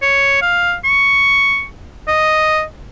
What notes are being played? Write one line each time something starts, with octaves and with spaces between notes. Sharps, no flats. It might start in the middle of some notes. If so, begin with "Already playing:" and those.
C#5
F5
C#6
D#5